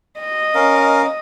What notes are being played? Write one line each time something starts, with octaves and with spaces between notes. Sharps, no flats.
D#5
C#4 A#4 F5